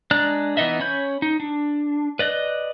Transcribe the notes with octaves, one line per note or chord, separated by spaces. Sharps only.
G#3 D4 D5 A#5 F#6
E3 B3 D#4 D#5 E5
C#4 C#5 B5 G6
D#4
D4
B4 D5 D#5 F#6